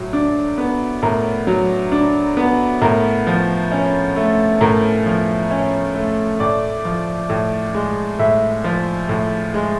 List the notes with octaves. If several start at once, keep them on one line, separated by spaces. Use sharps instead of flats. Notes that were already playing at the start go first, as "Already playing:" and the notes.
Already playing: A2 F#3
D4
B3
A2 A#4
F#3
D4
B3
A2 A#4
F3
C#4
A3
A2 A#4
F3
C#4
A3
A2 D5
F3
A2
G#3
A2 E5
F3
A2
G#3